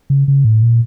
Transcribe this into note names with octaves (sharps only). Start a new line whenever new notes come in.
C#3
C#3
A2
A#2